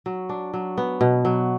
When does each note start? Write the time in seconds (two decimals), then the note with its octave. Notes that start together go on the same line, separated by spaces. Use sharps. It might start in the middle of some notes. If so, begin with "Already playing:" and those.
0.06 F#3
0.29 D4
0.54 F#3
0.78 B3
1.01 B2
1.25 F#3